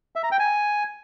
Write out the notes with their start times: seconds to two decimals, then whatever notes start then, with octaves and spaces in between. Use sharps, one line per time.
0.16 E5
0.24 A#5
0.32 G5
0.39 G#5